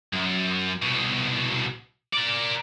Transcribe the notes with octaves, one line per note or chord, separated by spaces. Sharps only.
F#2
C2 B2
A#4 D5